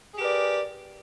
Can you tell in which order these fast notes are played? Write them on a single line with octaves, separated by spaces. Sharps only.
G#4 G4 A#4 B4 D5